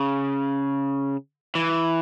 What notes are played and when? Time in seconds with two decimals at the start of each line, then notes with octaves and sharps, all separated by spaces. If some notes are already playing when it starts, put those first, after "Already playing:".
Already playing: C#3
1.55 E3